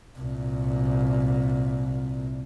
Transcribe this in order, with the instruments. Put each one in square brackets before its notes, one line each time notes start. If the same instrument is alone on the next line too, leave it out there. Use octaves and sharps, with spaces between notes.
[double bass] C2 A#2